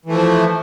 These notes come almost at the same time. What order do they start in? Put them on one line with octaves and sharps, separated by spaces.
E3 A3 F3